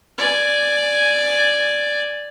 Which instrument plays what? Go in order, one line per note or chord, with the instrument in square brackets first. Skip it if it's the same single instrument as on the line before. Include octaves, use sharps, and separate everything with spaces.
[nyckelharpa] D5 G#5